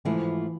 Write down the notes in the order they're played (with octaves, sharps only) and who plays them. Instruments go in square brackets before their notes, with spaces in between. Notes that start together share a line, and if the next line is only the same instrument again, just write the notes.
[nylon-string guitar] G#2 F3 A3 E4 [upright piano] E3